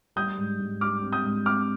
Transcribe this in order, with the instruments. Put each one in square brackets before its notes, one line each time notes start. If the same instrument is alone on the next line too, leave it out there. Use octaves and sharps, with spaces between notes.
[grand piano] G3 [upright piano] D#6 G6
[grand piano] G#2
G#2
[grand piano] G3 [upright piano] D6 F6
[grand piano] C4
[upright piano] D#6 G6
[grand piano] G#2
[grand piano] C4 [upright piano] D6 F6